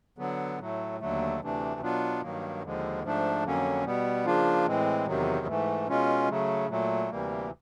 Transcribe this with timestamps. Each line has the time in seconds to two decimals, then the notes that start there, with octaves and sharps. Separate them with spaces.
0.18 D3 F#3 B3
0.59 A2 F#3 A3
1.00 D#2 D3 F#3 A3
1.41 D2 C3 E3 A3 D4
1.81 B2 F#3 B3 D4 F4
2.21 G2 D#3 F#3 A#3
2.62 D#2 D3 F3 G#3
3.03 G#2 F3 A3 D4
3.44 F2 D3 F#3 A#3 C#4
3.84 B2 G3 B3
4.25 C#3 F3 A#3 D4 F4
4.66 A2 E3 G#3 C4
5.06 E2 C3 D#3 F#3
5.47 G#2 E3 A3
5.88 B2 G#3 C#4 F4
6.28 C#3 F#3 A3
6.69 A#2 F#3 A3
7.10 D2 C3 E3 G3 A#3